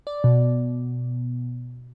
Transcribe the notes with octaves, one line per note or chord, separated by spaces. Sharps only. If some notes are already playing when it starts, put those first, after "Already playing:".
D5
B2